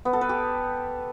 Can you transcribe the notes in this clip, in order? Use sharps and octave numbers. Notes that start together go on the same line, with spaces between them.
B3
A4
B4
G4